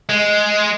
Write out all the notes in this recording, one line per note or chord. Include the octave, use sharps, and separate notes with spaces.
G#3